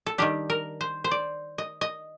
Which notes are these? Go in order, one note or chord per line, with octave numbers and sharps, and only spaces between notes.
A4
D#3 G3 D4 G4
A#4
C5
C5
D5
D#5
D#5